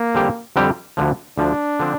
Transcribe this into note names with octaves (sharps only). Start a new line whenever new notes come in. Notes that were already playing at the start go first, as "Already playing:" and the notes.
Already playing: A#3
F2 D3 G3 C4 G4
F2 D3 G3 C4 G4
D2 D3 F3
D2 D3 F3 D4
D3 F3 C4